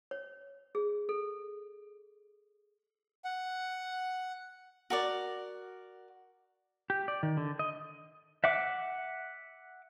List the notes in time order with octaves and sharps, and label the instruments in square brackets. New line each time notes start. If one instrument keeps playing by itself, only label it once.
[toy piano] C#5
G#4
A4
[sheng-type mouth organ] F#5
[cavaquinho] F#4 A#4 D5
[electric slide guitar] G4
D5
D#3
D3
D#5
[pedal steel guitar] E5 F#5 D6